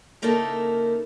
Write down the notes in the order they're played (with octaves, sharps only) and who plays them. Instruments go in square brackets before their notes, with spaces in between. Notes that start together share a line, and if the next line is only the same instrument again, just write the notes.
[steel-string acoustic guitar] C#3 A#3 D#4 E4 A4 A#4